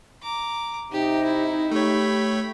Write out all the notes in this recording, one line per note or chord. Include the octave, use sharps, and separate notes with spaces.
A#5 D6
C3 D#4 G4
E4
A3 G4 C#5 G5 B5